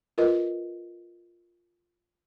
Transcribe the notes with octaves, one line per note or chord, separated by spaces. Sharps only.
F4 A#4 B4 D#5